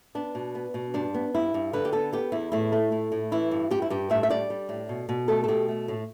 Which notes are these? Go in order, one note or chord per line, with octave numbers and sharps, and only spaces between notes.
B3 D4
B2
B3
B2
G2 D4
B3
G2 E4
G2
D3 B4
G4
B3 A4
B3 G4
E2 E4
A2 E4
A3
A2
A2
E3 E4
G2
G2 G4
E4
G2 G4
A2 E5
E5
G3 D5
G3
A2
B2
B2
A3 A4
A4
B2 G4
A3
A2